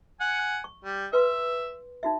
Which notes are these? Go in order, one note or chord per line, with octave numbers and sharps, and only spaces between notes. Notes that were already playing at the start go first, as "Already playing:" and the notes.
F#5 G#5
C#6
G3
B4 E5 C6
D#4 F#4 E5